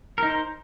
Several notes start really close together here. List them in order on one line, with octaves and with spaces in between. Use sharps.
A#4 D#4 C5